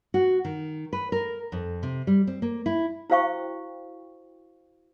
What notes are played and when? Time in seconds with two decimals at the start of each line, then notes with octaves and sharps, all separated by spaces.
0.14 F#4
0.45 D#3
0.93 B4
1.12 A#4
1.52 F2
1.83 C3
2.07 G3
2.27 C4
2.42 A#3
2.66 E4
3.10 E4 F#4 C5 F5 G5 C#6